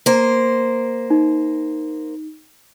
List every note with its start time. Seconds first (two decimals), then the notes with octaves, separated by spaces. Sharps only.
0.06 A#3 C5
1.10 D#4